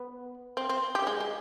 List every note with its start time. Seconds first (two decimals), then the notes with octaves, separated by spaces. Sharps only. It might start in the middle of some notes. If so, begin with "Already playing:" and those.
Already playing: B3
0.57 C4
0.69 C4
0.95 G4
1.07 G#3
1.20 G#3